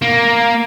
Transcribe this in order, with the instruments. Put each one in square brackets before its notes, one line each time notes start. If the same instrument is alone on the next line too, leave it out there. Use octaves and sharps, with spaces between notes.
[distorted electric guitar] A#3